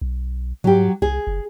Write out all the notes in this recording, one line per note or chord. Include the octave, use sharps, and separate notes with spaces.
B1
G#2 F#3 G4
C2 G#4
F#1